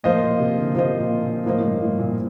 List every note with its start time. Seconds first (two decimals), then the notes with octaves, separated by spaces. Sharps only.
0.03 A2 F3 A#3 F4 C5 D#5
0.22 A#2
0.39 C3
0.57 D3
0.75 C3 F3 A#3 F4 C5 D#5
0.99 A#2
1.22 A#2
1.46 A2 F3 A#3 F4 C5 D#5
1.58 A2
1.64 G2
1.81 A2
1.99 A#2